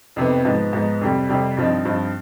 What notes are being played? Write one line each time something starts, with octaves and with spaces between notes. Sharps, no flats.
F2 C3 D#3 B3
G#2 F3 B3 D#4
G#2 F3 B3 D#4
F2 C3 G3
F2 C3 G3
G2 F3 C4 D#4
G2 F3 C4 D#4